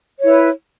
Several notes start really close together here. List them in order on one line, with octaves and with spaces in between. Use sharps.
C#5 E4 B4